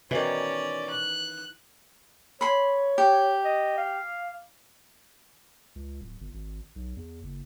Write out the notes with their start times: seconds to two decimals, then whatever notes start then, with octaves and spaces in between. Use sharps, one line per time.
0.11 B2 D#3 E3 C#4 D5
0.89 F#6
2.41 C#5 B5 C6
2.98 G4
3.45 D#5
3.77 F5
5.76 C#2
6.01 D1
6.21 G1
6.34 G#1
6.76 B1
6.97 E2
7.23 F#1